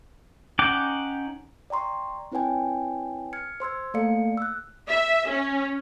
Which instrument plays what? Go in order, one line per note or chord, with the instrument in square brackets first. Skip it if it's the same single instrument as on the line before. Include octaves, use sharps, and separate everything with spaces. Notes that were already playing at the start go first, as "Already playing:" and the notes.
[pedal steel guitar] C#4 D#4 F#5 G5 D6
[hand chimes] D5 G5 A#5 C6 C#6
C4 E4 B4 C#5 G5 G#5
F6 G#6 C#7
C5 C6 E6 G#6
A3 A#3 A4 D5 F5 C#7
E6 F#6
[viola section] E5
C#4